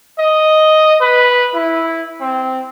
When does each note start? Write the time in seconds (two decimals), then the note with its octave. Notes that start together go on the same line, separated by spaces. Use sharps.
0.19 D#5
1.01 B4
1.54 E4
2.21 C4